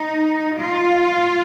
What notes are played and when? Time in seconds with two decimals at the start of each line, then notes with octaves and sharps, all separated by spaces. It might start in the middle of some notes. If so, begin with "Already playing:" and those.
Already playing: D#4
0.61 F4